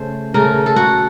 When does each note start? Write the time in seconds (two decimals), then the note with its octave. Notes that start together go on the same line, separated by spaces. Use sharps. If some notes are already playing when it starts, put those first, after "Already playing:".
Already playing: C#3 A3 C5
0.34 C#3 A3 A#4
0.66 A4
0.76 F#4